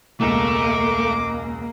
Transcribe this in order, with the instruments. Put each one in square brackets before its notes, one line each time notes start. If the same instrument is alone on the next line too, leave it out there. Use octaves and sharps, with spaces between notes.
[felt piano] E1 C#2 [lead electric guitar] A3 [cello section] A#3 [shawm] D6